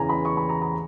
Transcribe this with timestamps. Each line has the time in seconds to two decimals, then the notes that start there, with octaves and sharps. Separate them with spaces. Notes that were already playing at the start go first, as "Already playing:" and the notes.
Already playing: E2 C#3 E3 G#5 A#5
0.09 B5
0.25 C#6
0.37 B5
0.49 A#5
0.61 A#5